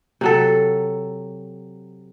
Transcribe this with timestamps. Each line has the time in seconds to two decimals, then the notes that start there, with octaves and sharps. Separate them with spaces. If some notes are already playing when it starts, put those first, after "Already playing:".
0.21 C3 F#3 A4